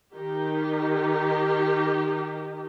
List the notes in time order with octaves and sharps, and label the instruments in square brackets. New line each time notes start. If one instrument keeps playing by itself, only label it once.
[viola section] D#3 D#4 G4